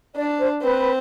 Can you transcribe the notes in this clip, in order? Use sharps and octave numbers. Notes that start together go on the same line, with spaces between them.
D4 D5
C5
C4 B4